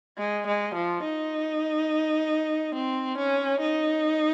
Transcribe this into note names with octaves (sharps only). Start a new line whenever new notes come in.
G#3
G#3
F3
D#4
C4
C#4
D#4